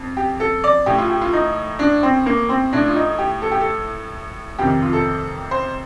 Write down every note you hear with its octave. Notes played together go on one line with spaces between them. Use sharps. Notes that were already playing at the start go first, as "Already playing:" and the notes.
Already playing: F2
G4
A4
D5
A2 G4
F4
G4
F4
D#4
D4
C4
A#3
C4
A2 D4
F4
D#4
G4
A4
G4
A4
F2 C3 D#3 G4
F4
A4
C5